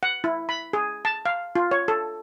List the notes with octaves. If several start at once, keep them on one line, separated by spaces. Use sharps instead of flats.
F#5
E4
B5
G#4
A5
F5
F4
C#5
A4